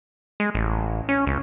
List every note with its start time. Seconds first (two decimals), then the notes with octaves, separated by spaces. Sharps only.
0.40 G#3
0.55 A1
1.09 C#4
1.27 C#2